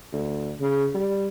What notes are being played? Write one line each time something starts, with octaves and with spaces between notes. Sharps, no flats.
D2
C#3
G3